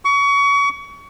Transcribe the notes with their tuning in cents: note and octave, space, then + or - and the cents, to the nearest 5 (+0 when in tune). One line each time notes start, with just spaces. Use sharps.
C#6 +30